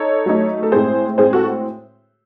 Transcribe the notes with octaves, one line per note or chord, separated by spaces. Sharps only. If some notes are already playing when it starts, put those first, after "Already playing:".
Already playing: D#4 A4 C#5
F#3 A3 D#4
A4
A2 G#3 C4 G#4 C5
A2 G#3 C4 G#4 C5
F#4 A4